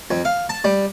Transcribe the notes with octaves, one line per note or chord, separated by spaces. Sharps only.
F2
F5
A5
G3